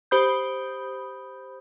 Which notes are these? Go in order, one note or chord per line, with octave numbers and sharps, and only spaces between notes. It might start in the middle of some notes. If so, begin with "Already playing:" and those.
G4 C5 B5 D#6 G6